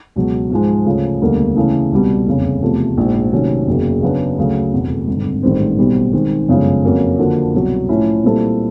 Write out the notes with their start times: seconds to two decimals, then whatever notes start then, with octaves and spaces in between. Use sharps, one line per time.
0.16 C#2 B2 F#3
0.51 G#2 F3 G#3
0.86 D2 C#3 F3
1.21 E1 D2 D3 G3 A#3
1.56 C#3 E3 A3 C#4
1.92 C2 B2 G3
2.27 F1 E2 C#3
2.62 E2 C3 F3 A3
2.97 A#1 G#2 F3
3.32 C3 D#3 F#3 A3 C#4
3.67 F#1 E2 C#3 F#3 A#3
4.02 C#3 F#3 B3 D4
4.38 D2 C#3 F#3
4.73 F1 E2 B2
5.08 G#1 G2 D3
5.43 A1 G#2 D#3 G3 C4
5.78 B1 B2 G3 C4
6.13 D#3 G#3 C4
6.49 G1 F#2 C#3 F3 G#3
6.84 F2 C#3 F#3 A#3 C#4
7.18 D3 F3 A#3 D4 F#4
7.54 C2 B2 F#3
7.89 A2 F3 A3 C#4 E4
8.24 A#2 G3 C4 E4 A4